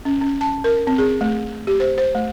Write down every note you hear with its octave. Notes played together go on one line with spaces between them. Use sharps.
C#4
C#4
A5
A#4
C4
G#4
A3
G4
C5
C5
A3